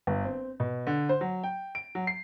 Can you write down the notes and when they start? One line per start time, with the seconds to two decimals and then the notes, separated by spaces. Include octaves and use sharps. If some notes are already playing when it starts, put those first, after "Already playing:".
0.07 G1
0.25 C4
0.60 B2
0.87 D3
1.09 C5
1.21 F#3
1.44 G5
1.75 D7
1.95 F#3
2.07 C7